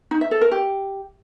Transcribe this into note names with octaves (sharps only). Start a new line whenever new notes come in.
D#4
E5
A4
A#4
G4